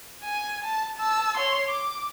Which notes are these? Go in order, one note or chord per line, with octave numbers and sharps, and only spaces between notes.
G#5
A5
A5 E6
C#5 C6
D6